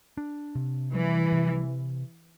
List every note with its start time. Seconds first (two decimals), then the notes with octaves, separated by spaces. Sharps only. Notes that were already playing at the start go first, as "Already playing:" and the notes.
0.17 D4
0.55 C3
0.94 E3 G3
1.32 C3